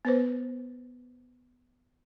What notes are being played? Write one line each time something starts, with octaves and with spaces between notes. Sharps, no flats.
B3 B4 C5